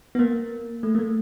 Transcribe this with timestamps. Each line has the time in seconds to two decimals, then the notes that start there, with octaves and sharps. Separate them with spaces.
0.15 B3
0.19 A#3
0.83 A3
0.95 A#3
0.99 A3